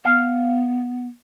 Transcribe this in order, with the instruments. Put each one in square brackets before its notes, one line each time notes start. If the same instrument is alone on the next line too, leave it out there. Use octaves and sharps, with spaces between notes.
[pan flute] B3 [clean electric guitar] F5